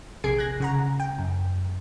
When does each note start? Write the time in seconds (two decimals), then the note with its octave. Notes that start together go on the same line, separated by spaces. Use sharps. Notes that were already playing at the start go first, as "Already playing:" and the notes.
0.24 A#1 C3 G#4 G#6 C7 D7
0.38 F#6 G#6 A#6
0.60 C#3 F#5 A#5
1.00 G5
1.19 F#2